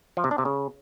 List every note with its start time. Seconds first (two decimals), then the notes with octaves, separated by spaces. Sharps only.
0.17 F3
0.24 C3
0.31 D4
0.38 C3
0.45 C#3